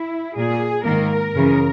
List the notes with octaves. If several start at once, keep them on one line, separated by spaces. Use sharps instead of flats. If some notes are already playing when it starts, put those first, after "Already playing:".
Already playing: E4
A#2 A#3 G#4
G#2 D#3 A#3 A#4
F#2 C#3 E3